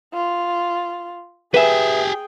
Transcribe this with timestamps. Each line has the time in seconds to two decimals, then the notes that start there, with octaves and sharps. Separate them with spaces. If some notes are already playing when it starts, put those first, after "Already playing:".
0.13 F4
1.54 G4 G#4 B4 E5 G5 G#5